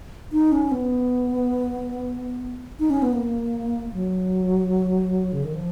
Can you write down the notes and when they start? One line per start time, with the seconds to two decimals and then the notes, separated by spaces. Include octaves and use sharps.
0.32 D#4
0.52 C#4
0.72 B3
2.79 D#4
2.90 C#4
3.02 B3
3.13 A#3
3.93 F#3
5.33 C#3
5.44 D#3
5.54 F3